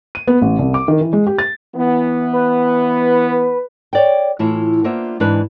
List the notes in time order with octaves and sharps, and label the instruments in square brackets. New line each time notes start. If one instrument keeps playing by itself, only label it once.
[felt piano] D#7
B3
A1
C2
D6
D#3
E3
G#3
G4
A6
[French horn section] E3 B3
[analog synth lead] B4
[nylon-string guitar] C#5 D5 G5
A2 E3 E4 F4 E5
A#3 B3 D4 F4 C5 E5
G#2 E3 D4 B4